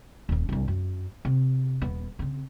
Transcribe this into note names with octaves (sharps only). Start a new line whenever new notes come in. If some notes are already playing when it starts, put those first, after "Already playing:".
D#1 C#4
C2 G2
F#2
C3
D#1 B3
C#3 C4